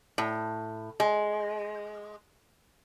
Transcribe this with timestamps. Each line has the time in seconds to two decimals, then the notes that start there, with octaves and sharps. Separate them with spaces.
0.18 A2
1.00 G#3